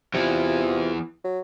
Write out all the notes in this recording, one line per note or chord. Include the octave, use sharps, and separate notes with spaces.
E2 C3 E3 F4
F#3